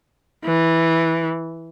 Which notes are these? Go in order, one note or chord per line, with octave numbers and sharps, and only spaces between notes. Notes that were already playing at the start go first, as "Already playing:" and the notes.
E3